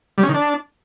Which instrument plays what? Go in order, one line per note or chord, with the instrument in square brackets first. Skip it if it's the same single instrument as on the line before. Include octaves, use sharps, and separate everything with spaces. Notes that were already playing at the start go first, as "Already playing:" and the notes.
[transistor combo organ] G3
C#4
D#3
D4